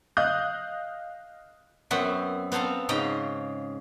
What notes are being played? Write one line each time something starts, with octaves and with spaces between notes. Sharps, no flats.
D#5 F5 D#6 F#6 G6
F#2 B3 C4 E5 F#5
B3 C4 A4 F5 A#5
G#2 C#3 F4 D#5 G5 A#5